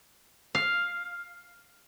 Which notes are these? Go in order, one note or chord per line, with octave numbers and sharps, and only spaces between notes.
F5